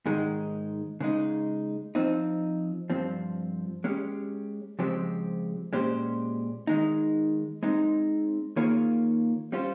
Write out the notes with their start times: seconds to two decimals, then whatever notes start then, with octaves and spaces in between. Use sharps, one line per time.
0.06 G#2 D#3 G#3 D#4
1.00 C#3 G#3 D#4
1.95 F3 C4 D#4
2.90 G2 F3 C4
3.84 G#3 C#4 G4
4.79 C#3 F3 G#3 C4 G4
5.73 A#2 G#3 C#4 G4 C5
6.67 D#3 G#3 D#4
7.63 G#3 C4 D#4
8.56 D#3 A#3 F4 G#4 C#5
9.52 G3 C#4 F4 C5